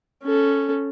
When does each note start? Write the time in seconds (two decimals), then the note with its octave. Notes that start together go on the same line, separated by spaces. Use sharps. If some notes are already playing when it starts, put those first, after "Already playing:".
0.23 C#4 A4